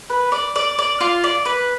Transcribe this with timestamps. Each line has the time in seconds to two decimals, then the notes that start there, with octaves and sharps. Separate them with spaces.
0.10 B4
0.32 D5
0.56 D5
0.79 D5
1.01 F4
1.24 D5
1.45 B4